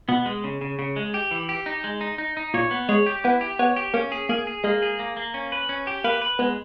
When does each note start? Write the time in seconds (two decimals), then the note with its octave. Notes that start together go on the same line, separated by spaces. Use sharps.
0.08 B2 B3
0.26 G#3
0.44 C#3
0.61 C#3
0.79 C#3
0.96 G#3
1.14 G4
1.31 E3
1.49 G4
1.66 D#4
1.84 G#3
2.01 D#4
2.18 D#4
2.37 D#4
2.54 A#2 C#5
2.71 B3
2.89 G#3 C#5
3.06 G4
3.24 B3 E4
3.41 G4
3.59 B3 C#5
3.76 G4
3.94 A#3 C#4
4.12 G#4
4.29 A#3 G#4
4.47 G#4
4.64 G#3 A#3
4.82 G#4
5.00 A#3
5.17 A#3
5.34 C#4
5.52 B4
5.69 C#4
5.87 G4
6.04 A#3 B4
6.22 B4
6.39 G#3 B3